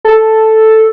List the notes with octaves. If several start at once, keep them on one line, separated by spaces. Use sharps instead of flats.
A4